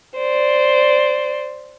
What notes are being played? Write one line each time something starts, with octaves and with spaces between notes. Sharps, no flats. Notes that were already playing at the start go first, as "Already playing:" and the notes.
C5 D5